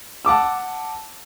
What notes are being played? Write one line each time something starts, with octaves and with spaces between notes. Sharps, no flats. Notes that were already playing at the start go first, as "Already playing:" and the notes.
F#5 A5 D6 E6